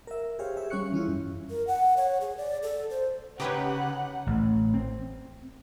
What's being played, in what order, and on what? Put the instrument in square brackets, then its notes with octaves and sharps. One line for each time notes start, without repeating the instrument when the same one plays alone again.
[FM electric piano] A#4 E5
G4 G#4 C5 C#5 F5
G4 G#4 E5
G3 C#4 C#5 C#6 F#6 C#7
E3 C#4 E4 F4
F#2
[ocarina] A#4
F#5
C#5
G#4
D5
A4
C5
[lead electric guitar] C#3 [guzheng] C#4 D#4 [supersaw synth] G4 B4 [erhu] F#5
[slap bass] A1
C4